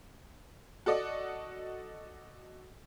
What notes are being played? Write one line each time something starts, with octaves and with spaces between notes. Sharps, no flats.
F#4 A4 D5 D#5